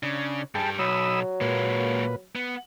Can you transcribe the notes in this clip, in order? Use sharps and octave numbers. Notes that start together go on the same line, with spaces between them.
C#3 D4
G2 G3 G#4 G5 A5
B1 F#3 B5 D#6 E6
A#2 G#3 A#3 B4
B3